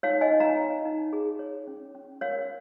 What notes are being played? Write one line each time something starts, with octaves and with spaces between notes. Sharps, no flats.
D#4 C#5 F5
D#5 G#5
D#4
F5 A#5
C#5
D#4
G#4
C#5
C#4
C#4
A#4 C#5 F5